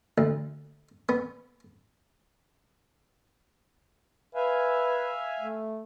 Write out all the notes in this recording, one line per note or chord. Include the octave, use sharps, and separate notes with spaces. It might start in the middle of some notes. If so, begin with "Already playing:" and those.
D2
B3
B4 E5 F5 G#5
A3